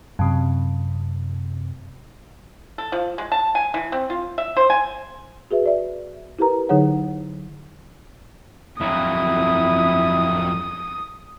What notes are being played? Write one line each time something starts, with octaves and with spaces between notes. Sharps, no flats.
F#2 C3
A4
F3
G#3
A5
G#5
E3
C4
F4
E5
C5
G#5
F#4 G#4 B4 E5
D5 E5
E4 G4 A#4 B4 A#5
D3 F#3 D#4 G#4 C#5 F#5
F2 F#3 E4 D#6